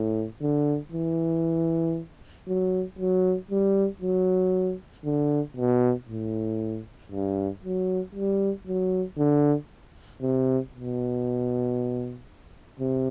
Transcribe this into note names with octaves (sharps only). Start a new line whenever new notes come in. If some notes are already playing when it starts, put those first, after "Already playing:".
Already playing: A2
D3
E3
F#3
F#3
G3
F#3
D3
B2
A2
G2
F#3
G3
F#3
D3
C3
B2
C3